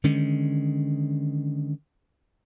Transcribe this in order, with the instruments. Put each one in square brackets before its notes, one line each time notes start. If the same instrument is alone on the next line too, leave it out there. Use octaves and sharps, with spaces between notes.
[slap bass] D3 D#3 G#3 C#4